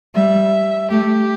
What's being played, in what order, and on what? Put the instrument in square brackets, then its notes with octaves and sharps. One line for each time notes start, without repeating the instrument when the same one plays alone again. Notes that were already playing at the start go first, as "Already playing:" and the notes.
[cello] G3 [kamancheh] E5
[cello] A3 [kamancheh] G4